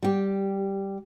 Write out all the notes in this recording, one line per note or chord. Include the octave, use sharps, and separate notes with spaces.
G3 G4